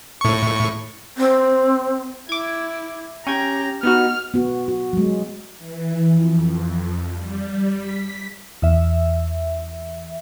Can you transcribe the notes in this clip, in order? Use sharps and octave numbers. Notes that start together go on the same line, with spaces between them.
A2 C#6
C4
E4 D6 G#6
C#4 G4 G5 A#5 G#6
B3 D#4 F#4 F6
B3 F#4
F#4
F#3 G#3
E3
F2
G3
B6
E2 E5